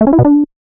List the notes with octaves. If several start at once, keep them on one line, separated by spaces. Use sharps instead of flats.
A3
C#4
E4
B2
D4